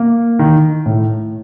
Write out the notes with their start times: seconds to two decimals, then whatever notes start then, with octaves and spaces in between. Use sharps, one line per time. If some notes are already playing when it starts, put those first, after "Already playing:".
Already playing: A#3
0.39 D#3
0.86 A2